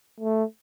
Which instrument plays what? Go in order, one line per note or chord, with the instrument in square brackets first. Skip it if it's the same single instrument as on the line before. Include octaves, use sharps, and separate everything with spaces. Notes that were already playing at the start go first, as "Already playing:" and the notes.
[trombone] A3